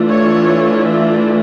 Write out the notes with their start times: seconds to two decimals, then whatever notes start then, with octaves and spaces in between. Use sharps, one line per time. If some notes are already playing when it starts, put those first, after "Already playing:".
Already playing: E3 A3 D4 F4
0.09 C#5
0.87 E5